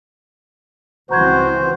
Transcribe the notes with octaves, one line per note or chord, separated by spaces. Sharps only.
C#2 E3 C4 F#4 C5 A#5 G6 G#6